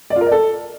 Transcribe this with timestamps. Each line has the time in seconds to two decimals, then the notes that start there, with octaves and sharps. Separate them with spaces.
0.10 D5
0.16 F4
0.21 A#4
0.26 D5
0.32 A4